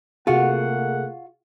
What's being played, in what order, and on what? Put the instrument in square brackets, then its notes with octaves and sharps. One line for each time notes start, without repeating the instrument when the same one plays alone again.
[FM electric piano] C3 G#4 [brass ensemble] A3 A#3 F#5 [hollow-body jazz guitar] F4 F#4